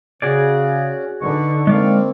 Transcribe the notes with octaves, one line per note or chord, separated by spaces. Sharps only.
C#3 C#4 F#4 G#4 D5
D3 D#4 B4 C#6
G#3 A#3 C4 D5 F5